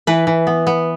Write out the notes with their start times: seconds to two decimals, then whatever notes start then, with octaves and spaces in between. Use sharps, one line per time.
0.07 E3 B4
0.27 E3
0.47 B3
0.67 B3